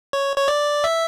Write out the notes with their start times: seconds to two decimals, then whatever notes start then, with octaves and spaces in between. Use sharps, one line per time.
0.13 C#5
0.37 C#5
0.48 D5
0.84 E5